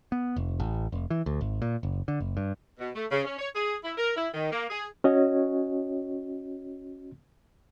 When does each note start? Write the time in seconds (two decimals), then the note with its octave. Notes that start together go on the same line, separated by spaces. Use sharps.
0.12 B3
0.36 F1
0.60 A1
0.92 F1
1.10 E3
1.26 D2
1.41 G#1
1.62 A#2
1.83 F#1
2.08 D3
2.20 F#1
2.37 G2
2.80 B2
2.95 A3
3.11 C#3
3.24 C#4
3.39 C#5
3.55 G#4
3.84 E4
3.97 A#4
4.17 E4
4.34 D#3
4.52 A#3
4.70 G#4
5.04 C#4 F#4 C#5 D#5